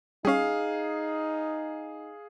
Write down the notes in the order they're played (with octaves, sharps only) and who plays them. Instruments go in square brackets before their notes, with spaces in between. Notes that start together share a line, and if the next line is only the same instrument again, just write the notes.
[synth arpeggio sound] G3 C#4 [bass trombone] D#4 [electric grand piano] G#4 F5